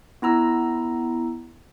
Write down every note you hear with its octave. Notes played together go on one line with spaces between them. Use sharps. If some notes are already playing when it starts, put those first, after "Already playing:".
B3 E4 A#5 E6